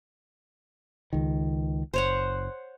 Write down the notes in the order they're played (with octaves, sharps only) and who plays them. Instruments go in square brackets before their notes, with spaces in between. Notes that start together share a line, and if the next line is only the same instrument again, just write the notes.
[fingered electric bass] C#2 D#3
[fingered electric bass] F#1 [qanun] C5 C#5 F#5